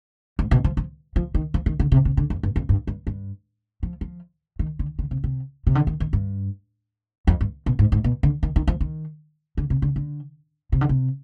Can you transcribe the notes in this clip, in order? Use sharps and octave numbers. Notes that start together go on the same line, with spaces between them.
G#2
B2
F3
F3
F3
D#3
F3
D#3
D3
C3
C3
D3
F2
G2
F2
G2
G2
G2
F3
F3
D#3
D3
D3
C3
C3
C3
D3
D#3
D#3
G2
F2
G2
B2
G#2
G#2
B2
D3
D#3
D#3
F3
D#3
D3
C3
D3
D3
C3
D3
C3